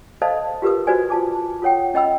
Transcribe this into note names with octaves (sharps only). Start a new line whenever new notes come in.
A4 C5 D5 D#5 F5 A5
F4 G4 A#4 B4 D#6
F#4 B4 C5 D5 G#5
F4 A5 D6
F4 A4 C#5 F#5 G5
C#4 D#5 G5 B5 E6